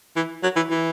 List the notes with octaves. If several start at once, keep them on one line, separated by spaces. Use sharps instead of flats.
E3
F#3
E3
E3